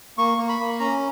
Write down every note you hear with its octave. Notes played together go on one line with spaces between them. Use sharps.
A#3 C#6
A#3
B5
A#3
C#4 A#5